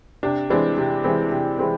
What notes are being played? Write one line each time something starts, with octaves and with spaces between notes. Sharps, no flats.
C3 D4
E3 G#3 C4 D4
C3
E3 G#3 C4
C3
E3 G#3 C4